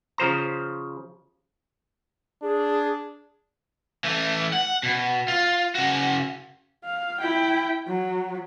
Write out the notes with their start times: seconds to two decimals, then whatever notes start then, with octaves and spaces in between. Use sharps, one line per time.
0.18 C#3 F3 C5 A#5
2.43 D4 G#4
4.04 E3 A3
4.53 F#5
4.83 B2
5.28 F4
5.75 C#3 F#4
6.85 F5
7.20 E4 G5
7.87 F#3